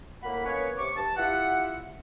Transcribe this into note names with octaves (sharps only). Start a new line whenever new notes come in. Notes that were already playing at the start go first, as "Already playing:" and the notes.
A2 A#3 F#5 B5
A#3 B3 C#4 B4 C#5
C3 C#6 D6
G2 A5
E4 F4 G4 F#5